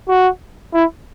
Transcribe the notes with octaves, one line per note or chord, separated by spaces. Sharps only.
F#4
E4